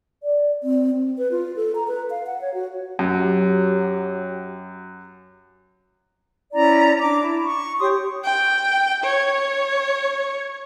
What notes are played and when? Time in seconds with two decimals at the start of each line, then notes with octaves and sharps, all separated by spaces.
0.23 D5
0.63 C4
1.18 B4
1.31 F4
1.56 A4
1.75 A#5
1.88 B4
2.10 F5
2.26 F#5
2.41 C#5
2.54 F#4
2.99 F#2 F#3 F#4 G4
6.53 C#4 E4 D5 A#5
6.99 D4 D6
7.22 E4
7.45 C#6
7.80 G4 C#5 C6 D#6
8.24 G5
9.04 C#5